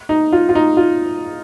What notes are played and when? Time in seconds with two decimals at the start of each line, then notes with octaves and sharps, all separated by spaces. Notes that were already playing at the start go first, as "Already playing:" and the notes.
0.09 D#4
0.32 F4
0.49 F4
0.55 D#4
0.77 F4